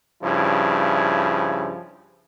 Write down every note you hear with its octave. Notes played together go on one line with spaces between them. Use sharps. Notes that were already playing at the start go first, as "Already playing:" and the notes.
G2 C#3 F3 E4